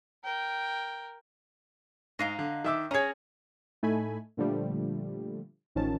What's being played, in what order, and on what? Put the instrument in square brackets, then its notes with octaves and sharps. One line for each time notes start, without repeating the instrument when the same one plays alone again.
[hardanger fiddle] A#4 G5
[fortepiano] G#2 [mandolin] D#5 F5 A#5
[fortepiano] D3
D#3 E5 D6
[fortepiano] C#4 G#4 [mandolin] C#5 A#5
[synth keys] A2 A3 D#4 A4 G#5 B5
A#2 D3 F3 G3 A3
A1 D#3 F3 C#4 A5